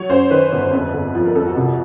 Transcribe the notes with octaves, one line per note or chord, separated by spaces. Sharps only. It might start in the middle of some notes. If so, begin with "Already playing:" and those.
Already playing: F#3 C#5
F#2 C5
D#3 B4
G1
F2
D3
F3
A#4
F2 A4
F#4
C2